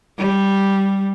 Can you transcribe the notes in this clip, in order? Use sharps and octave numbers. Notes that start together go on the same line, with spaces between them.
G3